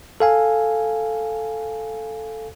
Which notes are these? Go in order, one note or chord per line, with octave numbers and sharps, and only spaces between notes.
A4 F5 G#5